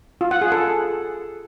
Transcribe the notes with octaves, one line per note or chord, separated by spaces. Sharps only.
F4
F#5
G#4
A4